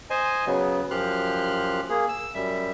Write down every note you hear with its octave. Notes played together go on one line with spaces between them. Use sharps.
C5 D#5 G#5
C#3 F#3 B3
F#2 F3 G4 C6 F6 F#6
A#3 G#4
E6
F#2 G3 E5